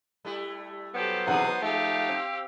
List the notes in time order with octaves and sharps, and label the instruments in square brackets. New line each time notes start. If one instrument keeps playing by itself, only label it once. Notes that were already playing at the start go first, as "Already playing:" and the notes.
[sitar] G3 A3 E4
[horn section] F#3 B3 C5 [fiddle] G4 A4
[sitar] B2 E3 G#4 [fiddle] D#4 D#6 [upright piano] F#5
[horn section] F3 A3 D#4 [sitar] G#3 [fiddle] G4 F5
[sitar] C4